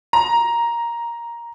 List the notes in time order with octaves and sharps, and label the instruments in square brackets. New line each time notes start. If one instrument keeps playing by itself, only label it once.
[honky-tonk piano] A#5